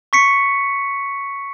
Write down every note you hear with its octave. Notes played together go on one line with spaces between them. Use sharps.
C#6 B6 C#7